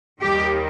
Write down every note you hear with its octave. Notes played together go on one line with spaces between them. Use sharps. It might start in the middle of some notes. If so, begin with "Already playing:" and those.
D#2 D#3 G3 G4